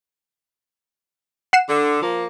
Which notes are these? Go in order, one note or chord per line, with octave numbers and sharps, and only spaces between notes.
F#5 C7 E7
D3
F3 A#3